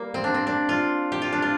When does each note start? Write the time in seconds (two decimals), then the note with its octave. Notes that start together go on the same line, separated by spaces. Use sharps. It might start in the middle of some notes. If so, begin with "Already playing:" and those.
Already playing: G3 A#3
0.14 C4
0.24 D4
0.34 C4
0.47 D4
0.69 F4
1.12 G4
1.22 F4
1.32 D4
1.42 F4